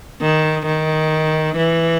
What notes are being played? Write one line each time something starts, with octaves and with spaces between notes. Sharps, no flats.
D#3
D#3
E3